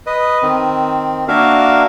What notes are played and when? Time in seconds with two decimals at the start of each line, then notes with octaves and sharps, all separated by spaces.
0.07 B4 D#5
0.43 D#3 C4
1.28 A#3 D4 F#4 A#4 E5 F5